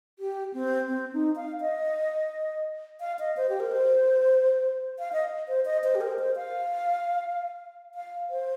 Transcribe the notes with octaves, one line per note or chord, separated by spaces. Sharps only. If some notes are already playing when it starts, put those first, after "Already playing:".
G4
C4
C4
D#4
F5
D#5
F5
D#5
C5
G4
A#4
C5
F5
D#5
C5
D#5
C5
G4
A#4
C5
F5
F5
C5